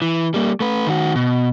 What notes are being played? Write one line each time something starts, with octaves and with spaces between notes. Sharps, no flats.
E3
G3 A#3
A3 B4
D#3 F#4
B2